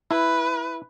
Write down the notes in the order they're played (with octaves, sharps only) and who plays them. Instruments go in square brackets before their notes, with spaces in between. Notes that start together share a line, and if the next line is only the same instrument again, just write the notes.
[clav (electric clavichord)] E4 [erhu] B4